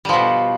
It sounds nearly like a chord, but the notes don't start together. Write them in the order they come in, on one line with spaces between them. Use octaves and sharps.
G3 F3 B2